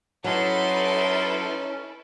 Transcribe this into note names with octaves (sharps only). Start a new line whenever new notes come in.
F#3 C#4 D#4 E4 A4 B4 C6